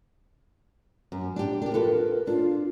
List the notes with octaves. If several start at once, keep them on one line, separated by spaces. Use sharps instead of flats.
F#2
D4 G4
D4 G4 A#4
F4 A4 B4
D4 F4